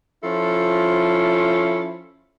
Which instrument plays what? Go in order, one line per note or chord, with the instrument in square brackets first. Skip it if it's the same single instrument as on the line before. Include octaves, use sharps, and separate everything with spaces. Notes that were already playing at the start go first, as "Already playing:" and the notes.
[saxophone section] F3 C#4 E4 F4 A4